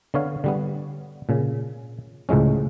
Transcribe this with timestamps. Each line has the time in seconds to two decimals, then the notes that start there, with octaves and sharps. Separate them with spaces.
0.14 D3 B3 C#5 F5
0.44 D3 G3 B3
1.29 A#2 C#3
2.29 C#2 A2 F3 G#3 C#4